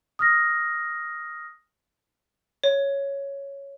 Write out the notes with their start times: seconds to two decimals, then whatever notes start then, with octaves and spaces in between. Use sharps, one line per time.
0.19 D#6 F6 A#6
2.64 C#5